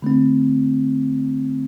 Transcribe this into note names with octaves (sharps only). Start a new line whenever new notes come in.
D3 A3 C4